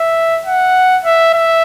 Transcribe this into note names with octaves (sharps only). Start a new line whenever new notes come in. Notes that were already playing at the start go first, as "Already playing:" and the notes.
Already playing: E5
F#5
E5
E5